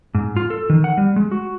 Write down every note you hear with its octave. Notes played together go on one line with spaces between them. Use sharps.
G#2
F4
A4
D#3
F#5
G3
G#3
F#4